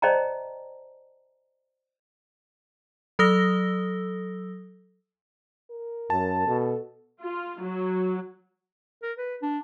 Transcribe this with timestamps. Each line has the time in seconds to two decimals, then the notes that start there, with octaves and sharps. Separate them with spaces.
0.02 C5 D5 D#5 G5 A5 A#5
3.19 F#3 A4 D#6 E6 A#6 G7
5.70 A#4
6.10 F#2 A5
6.47 B2 A4
7.21 F4
7.62 F#3
9.03 A#4
9.18 B4
9.42 D4